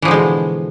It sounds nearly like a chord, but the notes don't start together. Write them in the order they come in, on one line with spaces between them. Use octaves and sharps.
E3 F3 D3 G#3 B2